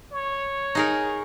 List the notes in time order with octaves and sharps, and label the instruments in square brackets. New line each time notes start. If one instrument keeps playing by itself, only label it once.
[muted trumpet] C#5
[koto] D#4 G#4 A#4